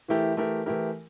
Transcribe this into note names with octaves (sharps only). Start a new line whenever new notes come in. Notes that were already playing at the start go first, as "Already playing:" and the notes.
E3 A3 E4 G4 A#4
E3 A3 E4 G4 A#4
E3 A3 E4 G4 A#4